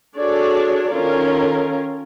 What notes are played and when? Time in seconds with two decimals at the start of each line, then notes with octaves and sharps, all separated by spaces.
0.16 D4 F#4 G#4 A4 C#5 D5
0.91 D#3 C#4 F4 A4 A#4